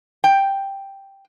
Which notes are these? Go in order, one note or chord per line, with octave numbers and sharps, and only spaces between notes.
G5